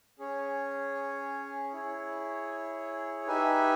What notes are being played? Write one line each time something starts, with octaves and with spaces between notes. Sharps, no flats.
C#4 G#4 C#5
E4 G#4 C#5
D#4 G4 B4 E5 G#5